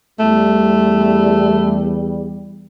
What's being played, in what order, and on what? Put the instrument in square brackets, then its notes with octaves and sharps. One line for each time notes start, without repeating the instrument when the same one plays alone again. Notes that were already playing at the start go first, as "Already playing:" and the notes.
[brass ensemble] E2 G3 [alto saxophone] A3